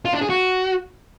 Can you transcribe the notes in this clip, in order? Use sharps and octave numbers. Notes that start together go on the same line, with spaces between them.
F4
D4
G#4
F#4